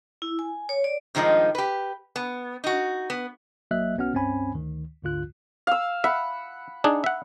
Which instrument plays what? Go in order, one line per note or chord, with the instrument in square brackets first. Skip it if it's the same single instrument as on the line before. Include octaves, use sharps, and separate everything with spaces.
[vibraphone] E4
G#5
C#5
D5
[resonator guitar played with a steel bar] G2 D#3 F3 G#3 D#4
G4 B4
B3
D#4 F#4
B3
[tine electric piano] G#1 F#3 A#3 D#5 E5 F#6
B1 B3 C#4 F#4 F#5 F6
C#2 G2 C4 C#4 G#5 B5
D2 D#3
A1 D2 G#2 D3 F4 F#6
[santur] F5 E6
[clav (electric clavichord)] E5 [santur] F#5 B5
[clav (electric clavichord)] D4 D#4 G#4
E5 F#5